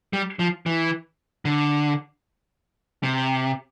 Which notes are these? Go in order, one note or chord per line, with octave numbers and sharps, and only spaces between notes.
G3
F3
E3
D3
C3